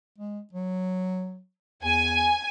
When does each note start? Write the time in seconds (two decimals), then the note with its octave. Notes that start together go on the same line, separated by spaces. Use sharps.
0.18 G#3
0.53 F#3
1.83 E2 G#5